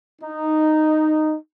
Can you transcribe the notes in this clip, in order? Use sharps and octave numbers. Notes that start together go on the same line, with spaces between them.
D#4